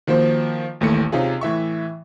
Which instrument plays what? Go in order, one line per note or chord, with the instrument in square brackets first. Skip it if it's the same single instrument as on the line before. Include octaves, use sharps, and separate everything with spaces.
[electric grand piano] D#3 F3 A#3 F#4 C5
A1 D#2 E3 A3 C#7
C3 C#4 D#4 F4 G#4
A2 E3 E5 C#6